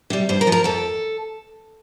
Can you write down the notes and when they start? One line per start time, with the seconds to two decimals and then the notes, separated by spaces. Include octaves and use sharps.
0.10 C3 G3
0.29 G2 C5
0.41 A#4
0.47 F3
0.52 A#4
0.64 F2 A4